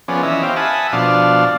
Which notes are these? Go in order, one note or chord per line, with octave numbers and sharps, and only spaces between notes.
F3 B3 C#4 G#4 D5
E3 C#4 D#5 E5
G4 C5 F5 D6
E5 F#5 G#5 A5 B5 D#6
B2 F3 D4 D5 F5